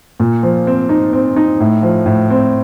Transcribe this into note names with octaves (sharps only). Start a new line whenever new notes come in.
A#2
F3
C4
D#4
C4
D#4
A2
F3
A2
C4